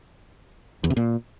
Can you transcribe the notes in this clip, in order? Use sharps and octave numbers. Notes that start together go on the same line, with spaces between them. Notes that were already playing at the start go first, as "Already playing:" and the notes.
E2
C3
A#2